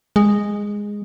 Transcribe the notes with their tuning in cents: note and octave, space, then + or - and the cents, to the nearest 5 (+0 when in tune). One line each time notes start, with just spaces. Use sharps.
G#3 -10